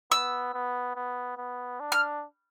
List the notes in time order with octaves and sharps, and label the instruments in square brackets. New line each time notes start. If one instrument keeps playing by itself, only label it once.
[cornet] B3 [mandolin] E6
[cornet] B3
B3
B3
D4
[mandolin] F6